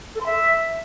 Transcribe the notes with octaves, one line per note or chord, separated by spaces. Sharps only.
A4
C6
E5